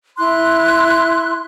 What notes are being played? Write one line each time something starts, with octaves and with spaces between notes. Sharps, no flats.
E4 C6 F#6